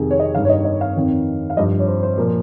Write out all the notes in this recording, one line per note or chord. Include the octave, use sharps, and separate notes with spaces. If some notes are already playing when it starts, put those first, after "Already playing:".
Already playing: F2 C3 D#3 G#4
C#5
D#5
G2 D#3 F5
C#5
D#5
D#5
F5
F2 D#3
F5
G2 F3 D#5
C#5
C5
C5
A#2 F3 A#4